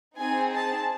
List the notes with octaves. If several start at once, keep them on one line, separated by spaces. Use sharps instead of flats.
C4 D#4 G#4 G#5
A5